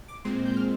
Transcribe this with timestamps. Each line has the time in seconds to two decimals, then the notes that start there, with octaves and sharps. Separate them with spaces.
0.08 D6
0.25 A#2 G#3 C4 C6
0.45 G6
0.56 F6